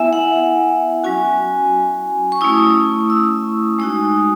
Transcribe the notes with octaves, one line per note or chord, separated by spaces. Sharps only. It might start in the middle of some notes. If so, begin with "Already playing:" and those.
Already playing: B3 E4 E5 G#5
F#5
F#3 C#4 F#4 G#5
C#6
A3 C#4 E4 D#6
E6
G#3 D#4 F#4 D#6